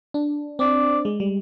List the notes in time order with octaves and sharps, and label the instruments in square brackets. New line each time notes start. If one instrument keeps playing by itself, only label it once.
[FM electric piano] D4
[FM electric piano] C4 [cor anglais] D5
[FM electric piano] G#3
G3